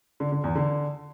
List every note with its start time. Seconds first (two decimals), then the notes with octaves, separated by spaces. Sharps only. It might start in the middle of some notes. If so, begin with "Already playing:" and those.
0.20 D3
0.32 D3
0.44 E2
0.55 D3